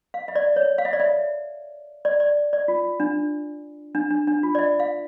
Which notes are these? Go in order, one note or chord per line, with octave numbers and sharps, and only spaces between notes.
F5
E5
D5
C#5
F5
E5
D5
E5
D5
D5
D5
F4
D4
D4
D4
D4
F4
D5
E5
F5